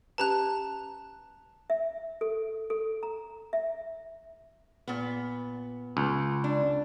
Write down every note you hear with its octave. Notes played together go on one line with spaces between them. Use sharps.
C#4 G4 B4 A5 A#5 F#6
E5
A4
A4
A#5
E5
A#2 B3
C#2
D4